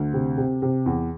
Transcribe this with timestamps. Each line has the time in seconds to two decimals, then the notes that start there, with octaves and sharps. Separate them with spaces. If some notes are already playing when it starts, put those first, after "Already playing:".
Already playing: D2
0.13 C3
0.38 C3
0.62 C3
0.86 E2